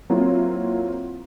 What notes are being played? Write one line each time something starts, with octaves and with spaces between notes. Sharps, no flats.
F#3 A#3 C4 E4 F4